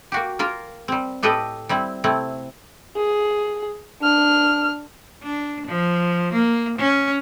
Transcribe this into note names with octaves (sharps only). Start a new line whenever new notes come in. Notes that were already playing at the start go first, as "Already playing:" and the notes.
A#3 F#4 G4
A#3 F4 A#4
G3 C4
A2 G4 A4 B4 D#5
G3 C4 E4
C3 A3 C4 E4
G#4
D4 F6
D4
F3
A#3
C#4